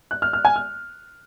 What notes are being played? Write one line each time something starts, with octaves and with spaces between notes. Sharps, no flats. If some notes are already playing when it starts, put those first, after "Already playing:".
F#6
F6
F6
G#5
F6